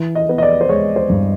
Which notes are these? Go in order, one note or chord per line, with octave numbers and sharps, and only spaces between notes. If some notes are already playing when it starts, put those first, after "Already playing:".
Already playing: E3
D#5
B3
D#5
D5
C5
G#3 C#5
C5
G2